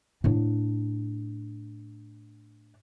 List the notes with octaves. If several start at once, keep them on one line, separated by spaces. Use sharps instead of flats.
A2 D4